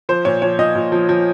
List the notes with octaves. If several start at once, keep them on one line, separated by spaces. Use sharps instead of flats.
F3 C5
A#2 C#5
F3 C#5
A#2 D#5
A#2
F3
F3